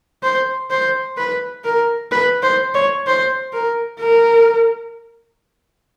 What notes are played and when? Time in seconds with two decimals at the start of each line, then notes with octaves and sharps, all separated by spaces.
0.23 C5
0.70 C5
1.18 B4
1.65 A#4
2.12 B4
2.43 C5
2.75 C#5
3.07 C5
3.54 A#4
4.00 A#4